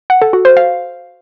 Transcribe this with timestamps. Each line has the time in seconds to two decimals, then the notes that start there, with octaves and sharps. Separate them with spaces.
0.10 F#5
0.22 A4
0.33 F#4
0.45 C5
0.57 F5